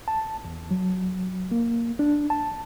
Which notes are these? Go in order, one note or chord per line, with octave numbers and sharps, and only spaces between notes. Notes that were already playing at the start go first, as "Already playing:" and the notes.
A5
E2
F#3
A#3
D4
A5